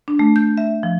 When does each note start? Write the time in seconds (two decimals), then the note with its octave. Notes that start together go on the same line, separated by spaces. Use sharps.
0.08 D4
0.19 A3
0.36 G6
0.57 E5
0.83 F3